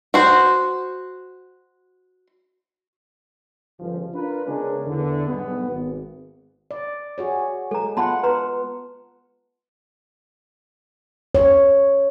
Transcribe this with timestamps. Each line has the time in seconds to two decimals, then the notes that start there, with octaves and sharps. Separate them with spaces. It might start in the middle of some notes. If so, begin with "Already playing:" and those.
0.14 F#4 C5
3.80 G1 C#2 F3
4.14 D4 F4 A#4 B4
4.47 C#3 G#3 B3 C#4 D4 A#4
4.86 E2 D3
5.28 B1 G#2 G3 B3
5.70 G#1
6.71 D5
7.18 F#4 G#4 C#5
7.71 G#3 A4 A#5
7.97 B3 F4 F#5 A5 B5 C6
8.23 B4 A#5 C6
11.35 C#5